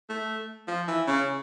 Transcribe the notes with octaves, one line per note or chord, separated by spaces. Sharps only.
A3
F3
E3
C#3